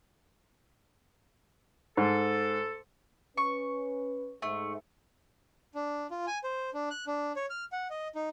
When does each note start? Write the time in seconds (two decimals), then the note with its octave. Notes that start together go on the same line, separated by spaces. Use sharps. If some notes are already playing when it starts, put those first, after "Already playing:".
1.97 G#2 A4
3.38 C#4 B4 C#6
4.42 G#2 A3
5.75 D4
6.11 F4
6.27 G#5
6.44 C5
6.74 D4
6.91 F#6
7.07 D4
7.36 C#5
7.50 F6
7.72 F#5
7.90 D#5
8.15 D#4